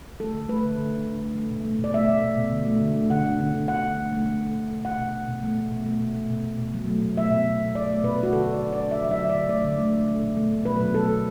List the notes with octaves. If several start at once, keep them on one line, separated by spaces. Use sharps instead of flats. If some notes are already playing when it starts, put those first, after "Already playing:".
A3 A4
D3
A3 B4
D3
D3
D3
D3
A3
A3
B2
A3
B2 D5
A3 E5
A3
B2
B2
D3
A3
D3
A3
D3 F#5
A3
D3
D3
D3 F#5
D3
A3
A3
A3
A3
B2
A3
B2 F#5
B2
B2
B2
A3
B2
B2
A3
B2
B2
B2
B2
B2
F#3
A3
B2
A3 E5
B2
B2
B2
B2 D5
A3
B2 B4
B2 F#4
D3 A4
D3 D5
D3
A3 D5
F#3 E5
F#3
E5
D3
D5
D3
A3 D5
D3
A3
A3
A3
B2
A3
B2
F#3 B4
B2
A3 A4
B2